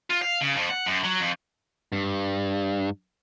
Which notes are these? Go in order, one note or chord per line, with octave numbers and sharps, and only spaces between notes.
F4
F5
C#3
F2
F#5
F#2
F#3
F2
G2